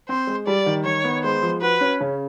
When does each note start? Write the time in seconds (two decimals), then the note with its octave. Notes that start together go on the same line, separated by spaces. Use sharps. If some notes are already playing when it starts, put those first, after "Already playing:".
0.09 C4 C5
0.27 G#3
0.47 G3 D5
0.66 D#3
0.85 D#3 C#5
1.04 B3
1.24 G#3 C5
1.42 F3
1.62 F#4 B4
1.81 C#4
2.00 C#3